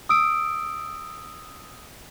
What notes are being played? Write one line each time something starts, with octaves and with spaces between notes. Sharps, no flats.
D#6 E6 D7